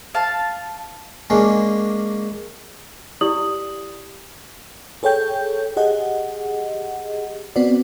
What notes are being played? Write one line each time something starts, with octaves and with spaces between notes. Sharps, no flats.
F5 A5
G#3 A#3 C#4 D4
E4 G4 D5 D#6 F#7
G#4 A4 C#5 G5 G6
G4 G#4 D#5 F#5
B3 C4 F#4 D5